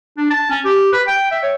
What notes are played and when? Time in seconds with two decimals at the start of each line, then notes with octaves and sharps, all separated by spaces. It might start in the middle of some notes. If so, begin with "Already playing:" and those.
0.17 D4
0.30 A5
0.50 C#4
0.65 G4
0.92 B4
1.07 G5
1.31 E5
1.43 C#5